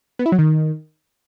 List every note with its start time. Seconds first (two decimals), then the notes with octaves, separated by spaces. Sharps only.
0.19 B3
0.26 E4
0.32 F#3
0.39 D#3